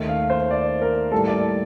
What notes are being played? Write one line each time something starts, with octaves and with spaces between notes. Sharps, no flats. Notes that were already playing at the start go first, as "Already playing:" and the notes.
Already playing: D#2 D#3 A3
F5
C5
D5
A#4
A2 G3 A#3 A4
D5